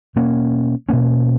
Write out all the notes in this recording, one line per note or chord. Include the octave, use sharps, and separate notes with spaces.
B2 A#3 C#4
B2 A#3 C#4